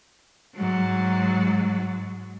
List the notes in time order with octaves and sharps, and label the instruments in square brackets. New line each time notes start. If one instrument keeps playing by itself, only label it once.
[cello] G#2 F#3